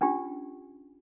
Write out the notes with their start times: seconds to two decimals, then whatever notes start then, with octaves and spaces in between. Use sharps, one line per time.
0.01 C#4 D4 F4 G4